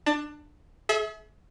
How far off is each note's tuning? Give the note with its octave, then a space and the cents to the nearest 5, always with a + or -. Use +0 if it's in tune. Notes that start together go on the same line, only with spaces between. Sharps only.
D4 +20 A5 +20
G#4 +40 E5 -20